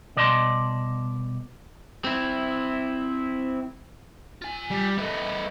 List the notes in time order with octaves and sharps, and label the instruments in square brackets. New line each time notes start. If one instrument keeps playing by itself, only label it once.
[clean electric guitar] C2 B2 D5 D#5 A5 C6
[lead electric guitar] C4 E4
[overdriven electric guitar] F4 G#5
[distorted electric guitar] G3
[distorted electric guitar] A3 B3 [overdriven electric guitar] E4 D#5